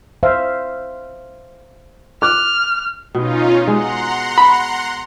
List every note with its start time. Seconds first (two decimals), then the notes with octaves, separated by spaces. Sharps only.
0.23 C5 E5 F5
2.22 D6 F6 F#6
3.15 B2 C#4 D#4 F4
3.67 G#3 F#5 A#5 C6
4.38 B5